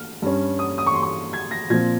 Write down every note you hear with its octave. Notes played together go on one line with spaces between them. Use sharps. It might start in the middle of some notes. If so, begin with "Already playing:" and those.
Already playing: F6
G2 G3 C#4
D#6
D#6
C#6
C6
C#6
G#6
A#6
A#2 F3 C4 G#6